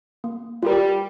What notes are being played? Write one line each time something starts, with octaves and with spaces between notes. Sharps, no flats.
A#3
G3 F4 A#4